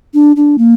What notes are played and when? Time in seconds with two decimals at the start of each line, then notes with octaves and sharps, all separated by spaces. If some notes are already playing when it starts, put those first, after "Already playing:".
0.14 D4
0.36 D4
0.58 A#3